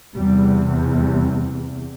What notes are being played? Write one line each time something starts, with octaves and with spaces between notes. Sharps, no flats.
E2 C3 G3
G3